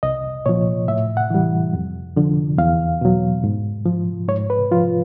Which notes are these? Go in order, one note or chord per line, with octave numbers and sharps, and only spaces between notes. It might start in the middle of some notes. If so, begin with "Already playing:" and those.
C2 D#5
A#2 F3 C#5
A2 E5
F#5
E3 G3
F2
D3 F3
E2 F5
B2 F#3
G#2
F3
G#2 C#5
B4
F3 F4